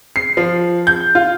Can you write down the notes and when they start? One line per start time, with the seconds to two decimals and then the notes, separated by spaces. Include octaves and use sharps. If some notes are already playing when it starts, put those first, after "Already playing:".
0.16 C7
0.37 F3
0.87 G6
1.15 F4